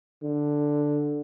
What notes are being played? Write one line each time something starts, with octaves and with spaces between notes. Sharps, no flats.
D3